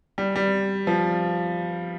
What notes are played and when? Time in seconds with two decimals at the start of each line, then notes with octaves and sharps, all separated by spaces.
0.18 G3
0.36 G3
0.87 F3